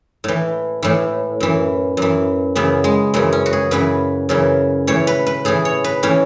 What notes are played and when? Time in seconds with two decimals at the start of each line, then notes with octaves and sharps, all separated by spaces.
0.24 A2 E3
0.83 A2 E3
1.40 F#2 E3
1.97 F#2 E3
2.55 F#2 C#3 E3 B3
2.84 G#3
3.14 F#2 C#3 E3 G#3
3.33 C#4
3.46 F#4
3.53 G#4
3.71 F#2 C#3 E3 B4
4.29 F#2 C#3 E3
4.87 A2 E3 C#5
5.07 B4
5.27 B4
5.45 A2 E3 G#4
5.65 C#5
5.84 B4
6.03 A2 E3 C#4